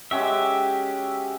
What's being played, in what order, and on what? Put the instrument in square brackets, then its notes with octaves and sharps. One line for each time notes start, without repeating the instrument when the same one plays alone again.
[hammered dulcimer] G#3 C#4 F#4 [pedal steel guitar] G4 E5